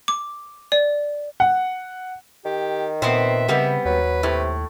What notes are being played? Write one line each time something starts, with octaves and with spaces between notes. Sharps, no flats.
D6
D5
F#5
D#3 G4
A#2 B3 C4 C5 E5
C#3 G3 B3 C4
D#2 F#3 B4
A2 C3